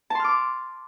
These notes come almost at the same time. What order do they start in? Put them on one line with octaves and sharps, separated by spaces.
A5 C6 F6 D6